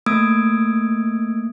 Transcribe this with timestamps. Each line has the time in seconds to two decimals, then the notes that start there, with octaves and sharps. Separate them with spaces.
0.06 A3 A#3 D#6 E6 G#6 D7